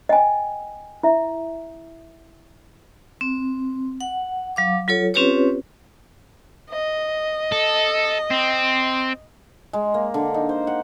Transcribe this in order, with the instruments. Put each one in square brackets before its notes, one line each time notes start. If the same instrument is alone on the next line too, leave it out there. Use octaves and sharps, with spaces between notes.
[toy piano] D#5 G5 G#5
E4 E5
[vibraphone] C4
F#5
F#3 F5 D6
F#3 F4 A4 C#5
C4 C#4 F4 G4 B4 C#5
[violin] D#5
[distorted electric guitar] A4
C4
[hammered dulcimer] G#3
A#3
D3
D#4
C5
F#5